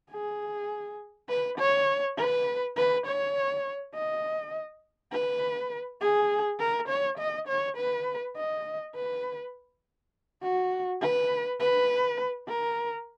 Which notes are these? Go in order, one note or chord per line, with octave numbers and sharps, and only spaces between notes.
G#4
B4
C#5
B4
B4
C#5
D#5
B4
G#4
A#4
C#5
D#5
C#5
B4
D#5
B4
F#4
B4
B4
A#4